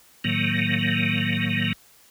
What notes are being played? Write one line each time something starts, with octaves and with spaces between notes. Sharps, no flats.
A2 D#3 F#3 A#3